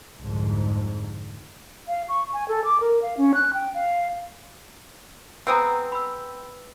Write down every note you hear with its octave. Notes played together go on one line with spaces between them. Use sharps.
C2 F2 G#2 D3
F5
C#6
G#5
A4
D6
A#4
F5
C#4
F#6
G5
F5
G#3 B3 C4 B4 G5 A#5 D#6 E6
B5 E6